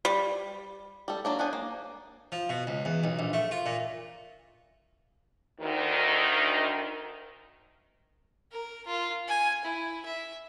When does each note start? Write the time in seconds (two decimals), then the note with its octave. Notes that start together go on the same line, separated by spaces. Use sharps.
0.05 G3
1.08 G3 A4
1.25 F#3 A#3 D4
1.39 B3 D4 C5 G#5
1.53 A#3
2.32 F3
2.49 B2
2.67 C#2
2.85 E2
3.04 B1
3.19 A#1
3.33 A3
3.51 F4
3.66 A#2
5.61 D2 D#3
8.52 A#4
8.87 F4
9.28 G#5
9.64 E4
10.06 E5